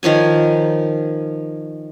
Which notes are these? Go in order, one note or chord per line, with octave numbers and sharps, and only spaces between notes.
D#3 F3 C#5 G#5